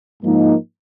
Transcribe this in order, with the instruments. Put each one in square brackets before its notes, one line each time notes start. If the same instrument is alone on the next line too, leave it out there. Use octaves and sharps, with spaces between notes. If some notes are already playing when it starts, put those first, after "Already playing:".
[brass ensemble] G#2 F3 A#3 D#4